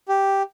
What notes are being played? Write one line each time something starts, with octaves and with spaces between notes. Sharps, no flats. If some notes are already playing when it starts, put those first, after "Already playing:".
G4